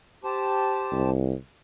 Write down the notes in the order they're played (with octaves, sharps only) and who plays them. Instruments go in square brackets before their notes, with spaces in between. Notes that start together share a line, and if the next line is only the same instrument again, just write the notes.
[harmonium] G4 C5 A5
[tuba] C2